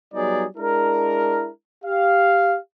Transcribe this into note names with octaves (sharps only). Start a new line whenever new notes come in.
F#3 G3 B3 D#4 G#4 D5
G#3 D4 E4 A#4
G4 F5